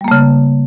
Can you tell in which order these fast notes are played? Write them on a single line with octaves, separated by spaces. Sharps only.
G3 A#3 A3 C#3